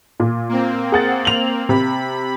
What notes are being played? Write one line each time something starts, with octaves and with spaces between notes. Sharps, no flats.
A#2
A#3 C4
G#4 F#5 A6
F7 F#7
C3 B5